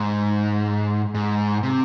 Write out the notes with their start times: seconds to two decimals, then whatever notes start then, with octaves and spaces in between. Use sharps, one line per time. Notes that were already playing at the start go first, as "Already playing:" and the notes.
Already playing: G#2
1.14 G#2
1.63 C3